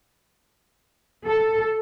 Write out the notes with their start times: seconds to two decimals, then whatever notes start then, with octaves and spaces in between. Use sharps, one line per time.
1.27 A4